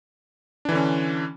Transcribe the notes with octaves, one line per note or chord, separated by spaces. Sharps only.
D3 E3 C#4 D4